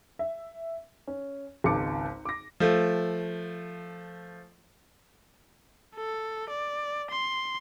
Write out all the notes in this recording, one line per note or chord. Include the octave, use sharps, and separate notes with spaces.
E5
C#4
G#1 C#2 D#3 A5 D6 C#7
D6 A#6
F3 A3
A4
D5
C6